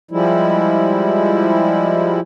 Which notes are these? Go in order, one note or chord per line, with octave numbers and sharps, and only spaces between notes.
F3 G3 G#3 E4